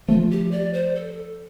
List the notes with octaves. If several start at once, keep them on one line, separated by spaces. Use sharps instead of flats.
F3 A3 F4
G4
D5
C5
A4